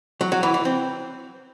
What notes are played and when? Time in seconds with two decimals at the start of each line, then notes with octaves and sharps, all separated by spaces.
0.21 F#3
0.32 F#3
0.43 E3
0.54 E3
0.65 C4